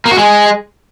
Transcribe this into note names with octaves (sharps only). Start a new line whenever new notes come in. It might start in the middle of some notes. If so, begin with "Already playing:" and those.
A#3
F#4
G#3